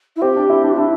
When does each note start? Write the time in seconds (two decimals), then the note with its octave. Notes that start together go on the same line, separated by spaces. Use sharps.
0.16 E4
0.21 C4 G4
0.36 D4
0.50 E4
0.64 D4
0.78 D4 E4